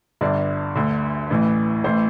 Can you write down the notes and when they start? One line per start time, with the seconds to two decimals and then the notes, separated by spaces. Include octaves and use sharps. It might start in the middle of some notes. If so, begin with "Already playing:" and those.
0.21 G1 G2 D3 D5
0.75 D2 D3
1.31 A1 A2 E3
1.84 A1 A2 E3 C5